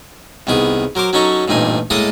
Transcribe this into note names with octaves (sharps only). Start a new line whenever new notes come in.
C2 D#3 B3 G#4
F#3 A#4 C5 D6
F#3 C#4 D#4 A4 A#5 C#6
A1 G2 A#2 C4 D#4 G#5
A2 G#3 A#3 A4 D#5 D#6